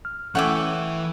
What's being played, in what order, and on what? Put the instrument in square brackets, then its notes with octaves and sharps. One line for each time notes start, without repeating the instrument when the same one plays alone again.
[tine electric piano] F6
[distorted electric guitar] E3 [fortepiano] A3 C#4 [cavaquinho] F#5 G5 D6 [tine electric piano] C#6 E6